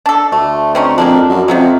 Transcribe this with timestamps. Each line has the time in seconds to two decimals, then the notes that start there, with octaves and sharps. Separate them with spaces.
0.06 D4 A4
0.32 D2 A3
0.75 C4 C#4 D#4
0.98 F2 G#3 A#3 D4
1.29 F#2
1.48 F2 C3 F#3 G#3